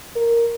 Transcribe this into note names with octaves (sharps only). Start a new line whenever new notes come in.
A#4